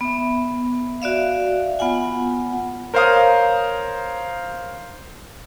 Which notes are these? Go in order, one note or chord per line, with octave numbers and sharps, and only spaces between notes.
B3 E5
F#4 D5 E5 F5
B3 F4 F#5 G#5
A#4 C5 C#5 F5 A#5 D#6